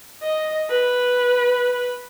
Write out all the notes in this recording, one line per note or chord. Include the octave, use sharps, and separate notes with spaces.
D#5
B4